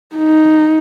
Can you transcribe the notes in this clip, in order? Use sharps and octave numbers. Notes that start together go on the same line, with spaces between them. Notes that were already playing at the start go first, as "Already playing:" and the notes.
D#4